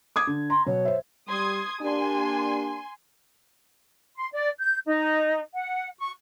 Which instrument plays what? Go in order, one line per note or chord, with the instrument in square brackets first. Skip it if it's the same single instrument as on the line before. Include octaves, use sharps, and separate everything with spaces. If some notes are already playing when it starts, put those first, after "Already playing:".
[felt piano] D6 D#6 G#6
D3
[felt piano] A#5 [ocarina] C6
[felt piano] B2 F#3 [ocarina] C#5
[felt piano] C5 E5
[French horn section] G3 [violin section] C6 D#6 G#6
[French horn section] A#3 D4 G4 [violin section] G#5 C6
[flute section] C6
D5
G6
D#4
F#5
C#6